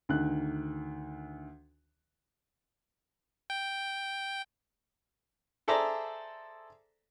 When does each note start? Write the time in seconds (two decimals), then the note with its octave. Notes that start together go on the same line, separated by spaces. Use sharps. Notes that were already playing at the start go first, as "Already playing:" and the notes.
0.09 D2 D#3 F#6
3.50 G5
5.68 G#4 A4 C5 D5 E5 A#5